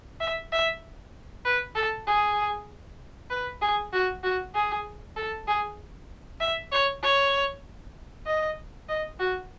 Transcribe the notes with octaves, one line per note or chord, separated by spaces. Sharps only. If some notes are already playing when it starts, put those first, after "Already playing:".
E5
E5
B4
A4
G#4
B4
G#4
F#4
F#4
G#4
A4
G#4
E5
C#5
C#5
D#5
D#5
F#4